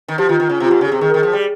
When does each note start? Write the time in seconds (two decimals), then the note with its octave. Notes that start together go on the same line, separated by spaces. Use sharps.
0.08 D#3
0.18 F3 G4
0.29 D#3 F4
0.40 D#3
0.49 C#3
0.60 C3
0.65 F4
0.70 G#2 G4
0.81 C#3
0.86 G#4
0.92 C3
1.01 D#3 G#4
1.10 A#4
1.14 D#3
1.17 G#4
1.23 F3
1.33 G3